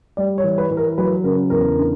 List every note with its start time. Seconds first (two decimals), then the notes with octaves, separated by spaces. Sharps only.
0.17 G3 D5
0.38 C#5
0.44 E3
0.58 B4
0.71 E3
0.77 A#4
0.98 F#3 B4
1.24 C#3 A#4
1.50 E2 A#4
1.77 D3